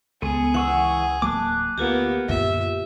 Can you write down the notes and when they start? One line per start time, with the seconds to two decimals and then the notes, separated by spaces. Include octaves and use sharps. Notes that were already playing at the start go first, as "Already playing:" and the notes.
0.22 C#2 B3 G#4 A4
0.54 E3 F#5 C#6 E6
1.22 D1 F#3 A#3 A5 D6 F#6
1.78 D2 A#3 B3 F4 G4
2.29 F#2 A#2 D3 E5